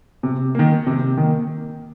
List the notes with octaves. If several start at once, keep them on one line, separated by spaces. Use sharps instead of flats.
C3
D#3 A#3
C3
D#3 A#3